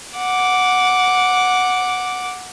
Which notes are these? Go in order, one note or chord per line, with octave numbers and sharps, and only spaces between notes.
F#5 D6